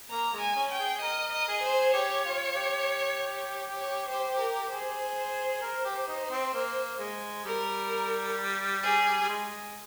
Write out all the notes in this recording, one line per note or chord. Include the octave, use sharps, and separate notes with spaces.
A#3 A#5
G#3
G#5
C#4
G5
G#4
A#4 D#5
D#5
G#4
C5
G4 C#5
F4
G4
C#5
C5
A#4
G#4 C5
C5
A#4 C5
G4
D#4
C4
A#3
G#3
G3 A#4
G#4
G3
G#3